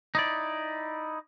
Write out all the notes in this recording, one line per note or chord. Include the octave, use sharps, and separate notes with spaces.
D#4 E4 D5